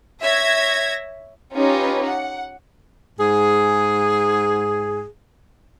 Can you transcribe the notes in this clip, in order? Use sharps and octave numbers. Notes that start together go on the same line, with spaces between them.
C#5 E5 G#6 A#6
C#4 D#4 F4 G4 B4
F#5
G#2 G#4